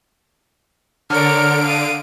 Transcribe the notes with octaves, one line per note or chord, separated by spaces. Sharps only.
D3 A#4 C#5 D5 F6 D7
F5 D#6